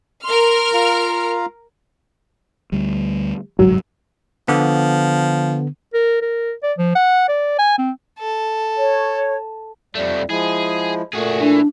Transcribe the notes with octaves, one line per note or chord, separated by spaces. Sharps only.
A#4 C6 F6
F4 F5 A#5
D2 G3
G1 C2 G#2 F#3
D3 F3 B3
A#4
A#4
D5
F3
F#5
D5
G#5
C4
A4
C#5
F2 G3 A3
F3 G#3 E4 G#4
A#2 A3 F#4 G#4
E3 D4